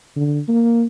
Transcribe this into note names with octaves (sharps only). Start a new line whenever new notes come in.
D3
A#3